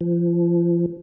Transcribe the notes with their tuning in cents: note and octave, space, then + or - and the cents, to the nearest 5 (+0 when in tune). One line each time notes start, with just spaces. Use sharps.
F3 -30